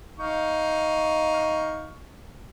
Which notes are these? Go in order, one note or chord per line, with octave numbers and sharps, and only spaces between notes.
D#4 F5 C#6